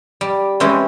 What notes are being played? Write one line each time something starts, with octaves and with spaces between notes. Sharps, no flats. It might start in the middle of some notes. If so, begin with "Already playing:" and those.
G3
E3 G#3 C4 C#4